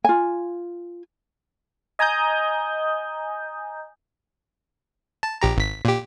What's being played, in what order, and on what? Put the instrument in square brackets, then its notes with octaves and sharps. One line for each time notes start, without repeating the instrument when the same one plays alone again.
[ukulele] F4 G#5
[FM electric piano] D#5 G#5 A#5 D#6 G6
[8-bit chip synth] A5
A#1 G4 A#5
G#1 B6
A#2 G4